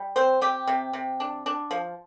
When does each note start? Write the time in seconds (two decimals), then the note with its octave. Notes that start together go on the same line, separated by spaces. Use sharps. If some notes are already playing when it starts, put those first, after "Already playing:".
Already playing: G3
0.16 C4 C5
0.41 C4 G4
0.67 C3
0.93 C3
1.20 D4
1.46 D4
1.71 F3